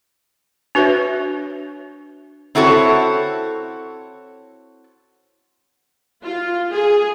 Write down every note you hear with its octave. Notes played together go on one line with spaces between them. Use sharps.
D4 F#4 B4 C#5 E5
C4 E4 F#4 A4 C#5
F4
G#4